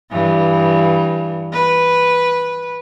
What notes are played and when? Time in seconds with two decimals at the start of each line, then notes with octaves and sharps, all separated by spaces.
0.11 G2 E3
1.52 B4